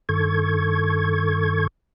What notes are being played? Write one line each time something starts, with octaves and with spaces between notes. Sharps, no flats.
G2 D#3 A4 C#6 G#6